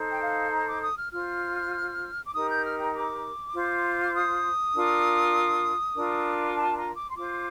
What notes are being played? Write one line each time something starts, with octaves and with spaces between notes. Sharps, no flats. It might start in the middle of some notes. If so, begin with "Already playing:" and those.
Already playing: D#4 A4 C5
G5
F5
A#5
D6
D#6
F6
F4 C5 F6
D6
D#4 G4 A#4 D#6
G6
F6
G5
D6
F4 C5
D6
D#6
D4 F4 A#4
D4 F4 A#4
A5
A#5
D6
C6
F4 C5 D6